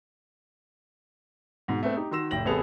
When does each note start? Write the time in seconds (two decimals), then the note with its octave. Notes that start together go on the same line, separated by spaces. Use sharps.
1.68 G#2 B2
1.83 A3 B3 C4
1.97 D#4 G4
2.11 D#3 F#4 C6 E6 A#6 E7
2.31 F1 A2 G5 A#6 F#7
2.45 A1 C3 B3 G#4 A4 F7